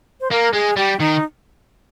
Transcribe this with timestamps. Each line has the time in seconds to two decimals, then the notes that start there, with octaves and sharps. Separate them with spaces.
0.21 C5
0.31 A#3 A#4
0.53 G#3 G#4
0.77 G3 G4
0.99 D#3 D#4